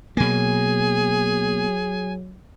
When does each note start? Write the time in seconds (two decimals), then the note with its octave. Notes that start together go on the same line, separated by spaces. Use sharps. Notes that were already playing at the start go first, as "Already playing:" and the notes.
0.17 B2 F#3 A#3 G#4 G#5